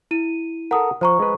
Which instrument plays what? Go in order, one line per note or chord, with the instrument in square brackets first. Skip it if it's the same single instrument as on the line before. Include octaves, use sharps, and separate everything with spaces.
[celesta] E4 D#7
[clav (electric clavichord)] A4 A#4 [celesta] F#5 D#6
[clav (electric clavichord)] F3 [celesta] C5 A#5 C#6
[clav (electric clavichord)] G#3 B4